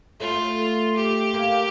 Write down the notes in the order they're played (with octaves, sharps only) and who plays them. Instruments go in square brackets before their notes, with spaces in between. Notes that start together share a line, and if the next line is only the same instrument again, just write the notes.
[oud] A3 [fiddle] F4
[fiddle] G4
[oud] A#3